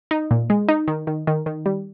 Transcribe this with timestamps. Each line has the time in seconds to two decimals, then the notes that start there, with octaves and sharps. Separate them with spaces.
0.11 D#4
0.31 A#2
0.50 G#3
0.69 D#4
0.88 D#3
1.07 D#3
1.27 D#3
1.46 D#3
1.66 G3